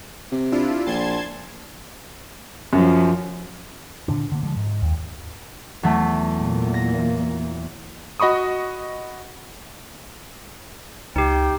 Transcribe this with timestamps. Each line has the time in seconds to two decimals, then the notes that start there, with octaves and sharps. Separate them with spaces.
0.32 C3
0.52 D4 E4 F4
0.86 A#1 A5 C6 G#6
2.73 F#2 F3 F#3
4.08 A#2 D3 D4
4.32 D3 A#3
4.43 D3 F3 G#3
4.56 G#2
4.82 D#2
5.83 E2 F#3 A3
6.39 A#2 E3 A#3
6.74 A#6
8.20 F#4 D#5 B5 C#6 D#6
11.16 C#2 D#4 G4 G5